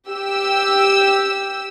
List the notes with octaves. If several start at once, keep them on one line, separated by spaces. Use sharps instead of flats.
G4 E6